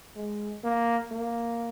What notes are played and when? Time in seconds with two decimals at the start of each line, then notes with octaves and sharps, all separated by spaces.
0.16 G#3
0.64 A#3
1.11 A#3